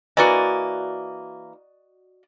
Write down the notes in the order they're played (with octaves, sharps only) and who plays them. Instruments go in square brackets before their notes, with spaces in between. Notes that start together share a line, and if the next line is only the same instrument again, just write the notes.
[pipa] E3 A#3 [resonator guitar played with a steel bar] F#4 D5 D#5